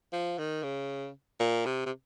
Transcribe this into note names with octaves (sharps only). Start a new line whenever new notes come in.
F3
D#3
C#3
A#2
C3
C3